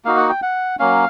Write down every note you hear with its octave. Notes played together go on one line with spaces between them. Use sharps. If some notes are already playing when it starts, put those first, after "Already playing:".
A#3 D#4 F#4 F5
F#5
G5
F#5
F#3 A#3 C#4 F5